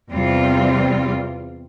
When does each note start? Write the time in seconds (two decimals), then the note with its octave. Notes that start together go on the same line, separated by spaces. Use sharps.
0.12 E2 C3 G3 C4 F4